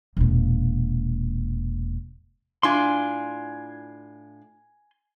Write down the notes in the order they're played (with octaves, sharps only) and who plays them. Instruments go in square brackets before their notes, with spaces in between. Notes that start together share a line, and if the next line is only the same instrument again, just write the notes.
[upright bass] E1 A#2
[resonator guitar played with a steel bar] A2 D4 F4 [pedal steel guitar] G#5 C6